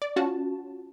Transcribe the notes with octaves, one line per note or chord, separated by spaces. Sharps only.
D5
C#4 F4 F#4 A5